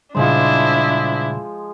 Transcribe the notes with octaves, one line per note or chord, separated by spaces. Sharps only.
A#2 C#3 F3 G3 G#3 D4 E4 C5